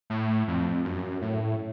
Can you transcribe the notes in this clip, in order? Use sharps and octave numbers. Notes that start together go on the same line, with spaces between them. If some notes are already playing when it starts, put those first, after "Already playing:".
A2
F2
F#2
A2